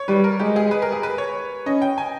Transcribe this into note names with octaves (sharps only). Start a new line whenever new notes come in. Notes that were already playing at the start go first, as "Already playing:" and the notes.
Already playing: C#5
G3 B4
A#4
G#3 G4
G#4
B4
A#4
G#4
B4
C#5
C#4 D#5
G5
G#5